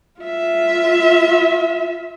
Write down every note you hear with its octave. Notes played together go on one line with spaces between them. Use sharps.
F4 E5